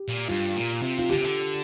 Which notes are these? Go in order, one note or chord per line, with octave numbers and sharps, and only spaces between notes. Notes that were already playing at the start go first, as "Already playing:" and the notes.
Already playing: G4
A#2
G2 F4
A#2
C3
F4
D3 G4
C3
D3